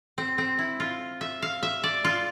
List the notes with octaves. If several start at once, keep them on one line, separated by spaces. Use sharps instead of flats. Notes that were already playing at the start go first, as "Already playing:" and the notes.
C4
C4
E4
F4
E5
F5
E5
D5
F4